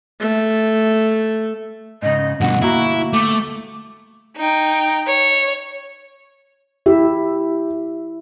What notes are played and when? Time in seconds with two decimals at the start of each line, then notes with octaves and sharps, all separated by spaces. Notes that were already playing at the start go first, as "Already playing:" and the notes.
0.20 A3
2.02 G#2 C#3 D#5
2.41 G2 B2 D3 F#5
2.61 D2 A#3 E4 F#4 A#5
3.13 A3 D6
4.37 D#4 G5
5.07 C#5
6.86 E4 G4 E5